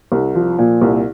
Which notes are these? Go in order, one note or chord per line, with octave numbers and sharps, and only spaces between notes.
C2
F3
A#2
C2